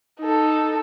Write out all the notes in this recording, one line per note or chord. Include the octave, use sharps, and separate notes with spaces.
D#4 A4